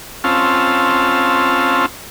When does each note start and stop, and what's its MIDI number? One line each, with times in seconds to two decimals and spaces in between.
0.24 1.86 60
0.24 1.86 61
0.24 1.86 65
0.24 1.86 81
0.24 1.86 88
0.24 1.86 89